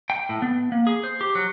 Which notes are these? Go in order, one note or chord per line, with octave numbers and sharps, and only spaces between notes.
G5
A2
B3
A#3
G#4
C5
G4
F#3